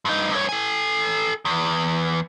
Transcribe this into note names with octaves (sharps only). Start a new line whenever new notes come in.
G2 D#4
G2 C#5
A4 G#5
E2